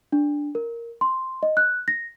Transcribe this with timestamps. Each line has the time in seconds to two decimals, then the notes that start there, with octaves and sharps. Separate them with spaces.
0.12 D4
0.55 A#4
1.01 C6
1.43 D#5
1.57 F#6
1.88 A#6